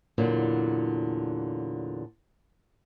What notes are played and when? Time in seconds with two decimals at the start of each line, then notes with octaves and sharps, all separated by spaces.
0.18 E2 A#2 D3 F#3